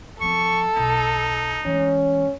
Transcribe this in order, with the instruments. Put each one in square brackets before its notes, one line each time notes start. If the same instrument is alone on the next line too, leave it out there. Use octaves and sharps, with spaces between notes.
[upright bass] F3 C4 [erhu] A4 [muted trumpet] C#6
[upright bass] B1 [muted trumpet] D#4
[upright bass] E3 G#3 [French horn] C#4